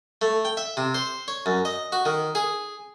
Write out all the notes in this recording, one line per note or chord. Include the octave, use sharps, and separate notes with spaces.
A3
G5
E5
C3
C5
C#5
F#2
D#5
F#4
D#3
G#4